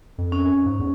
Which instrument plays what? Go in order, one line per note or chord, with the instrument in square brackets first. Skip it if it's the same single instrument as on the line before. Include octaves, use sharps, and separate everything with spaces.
[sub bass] F2
[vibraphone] C#4
[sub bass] G#2
E2